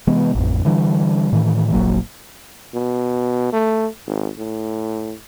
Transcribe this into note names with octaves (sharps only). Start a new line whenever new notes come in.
C3 E3 G#3 B3
A1 F2
D3 E3 G3 D4
A2 D#3 E3
F1 A#1 F#3 A#3
B2
A3
G#1
A2